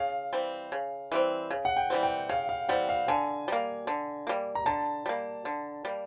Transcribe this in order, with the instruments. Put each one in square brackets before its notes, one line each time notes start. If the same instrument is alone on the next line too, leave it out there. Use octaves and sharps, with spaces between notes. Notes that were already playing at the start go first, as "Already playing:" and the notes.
Already playing: [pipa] C#3 [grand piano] F5
[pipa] E3 G3 C4
C#3
E3 G3 C4
C#3
[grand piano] F#5
G5
[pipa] E3 G3 C4
[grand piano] G5
[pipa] C#3 [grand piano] F5
[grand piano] F5
[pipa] E3 G3 C4 [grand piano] F#5
[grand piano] F5
[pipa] D3 [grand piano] G#5
[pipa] G3 A#3
D3
G3 A#3
[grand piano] A#5
[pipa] D3 [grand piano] A5
[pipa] G3 A#3
D3
G3 A#3